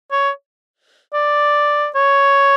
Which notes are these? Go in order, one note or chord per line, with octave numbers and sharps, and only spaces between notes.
C#5
D5
C#5